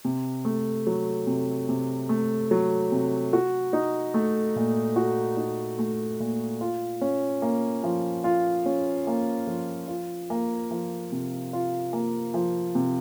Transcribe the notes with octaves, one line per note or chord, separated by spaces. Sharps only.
C3
A3
F#3
C3
C3
A3
F#3
C3
F#4
D#4
A3
A#2
F#4
D#4
A3
A#2
F4
C#4
A#3
F3
F4
C#4
A#3
F3
F4
A#3
F3
C3
F4
A#3
F3
C3